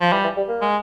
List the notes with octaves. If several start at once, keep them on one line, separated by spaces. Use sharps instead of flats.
F3
E3 G3
E3
G3
A#3
G#3